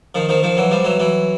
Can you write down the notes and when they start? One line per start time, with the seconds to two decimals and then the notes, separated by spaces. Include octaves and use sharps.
0.15 D#3 F3
0.29 D#3 F3
0.43 D#3 F3
0.57 E3 F#3
0.71 F3 G3
0.85 E3 F#3
1.00 E3 F#3